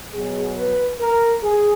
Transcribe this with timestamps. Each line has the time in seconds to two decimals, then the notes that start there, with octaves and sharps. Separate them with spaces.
0.13 B2 F#3 G#4
0.56 B4
1.00 A#4
1.43 G#4